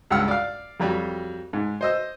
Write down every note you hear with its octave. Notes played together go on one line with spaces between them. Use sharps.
C#2 G2 F#5 E6 F6
D5 F5
F2 F#3 G3
G#2
C5 D#5 E6